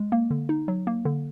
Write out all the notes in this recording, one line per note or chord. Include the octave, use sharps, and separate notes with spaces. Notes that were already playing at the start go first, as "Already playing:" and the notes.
Already playing: G#3
A#3
D3
D#4
F#3
A#3
D3